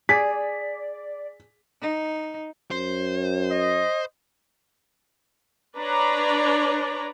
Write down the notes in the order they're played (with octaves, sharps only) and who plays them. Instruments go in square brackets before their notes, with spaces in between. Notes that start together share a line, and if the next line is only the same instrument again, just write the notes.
[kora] G#4 [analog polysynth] D5 [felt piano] B6
[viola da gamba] D#4
[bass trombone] F#2 [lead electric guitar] C5
[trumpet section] D#5
[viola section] D4 B4 C#5 D5 A#5